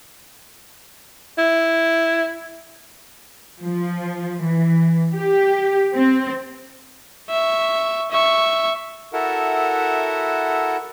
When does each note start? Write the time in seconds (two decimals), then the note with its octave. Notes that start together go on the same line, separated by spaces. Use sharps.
1.38 E4
3.61 F3
4.41 E3
5.15 G4
5.94 C4
7.30 E5 C#6
8.11 E5 C#6
9.13 E4 F#4 A4 A#4 E5 F#5